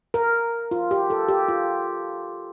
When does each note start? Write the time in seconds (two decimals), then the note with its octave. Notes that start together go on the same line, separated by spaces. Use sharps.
0.14 A#4
0.71 F4
0.91 G4
1.10 A4
1.28 G4
1.48 F4